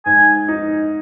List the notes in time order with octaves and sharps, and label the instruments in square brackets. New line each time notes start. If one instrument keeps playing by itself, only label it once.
[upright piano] G#2 [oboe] G#5
[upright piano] D#4